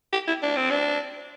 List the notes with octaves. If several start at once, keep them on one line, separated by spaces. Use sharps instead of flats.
G4
E4
D4
C4
D4